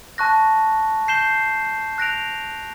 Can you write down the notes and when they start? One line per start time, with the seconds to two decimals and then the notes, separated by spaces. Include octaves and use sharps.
0.18 A5 C#6 F#6 A#6
1.08 G6 C7 E7 G7
1.98 F#6 A#6 D7 F7